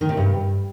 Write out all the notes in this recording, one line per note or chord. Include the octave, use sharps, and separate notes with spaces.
D#3
C3
G2